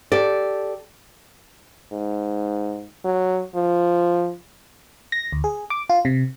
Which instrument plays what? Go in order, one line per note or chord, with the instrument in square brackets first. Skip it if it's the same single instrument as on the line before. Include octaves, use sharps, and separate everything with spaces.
[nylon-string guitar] G4 A4 D5
[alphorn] G#2
F#3
F3
[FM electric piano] A#6
D2
G#4
D6
F4
C3